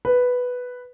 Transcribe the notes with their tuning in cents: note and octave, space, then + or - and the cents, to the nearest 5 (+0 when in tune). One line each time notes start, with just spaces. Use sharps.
B4 +0